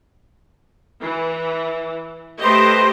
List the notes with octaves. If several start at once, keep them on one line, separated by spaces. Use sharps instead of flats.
E3
A3 G4 B4 C5 D#5